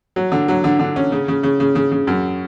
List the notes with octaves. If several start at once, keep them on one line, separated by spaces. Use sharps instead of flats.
F#3
D3
F#3
D3
D3
C#4
C#3
C#3
C#3
C#3
C#3
C#3
F#2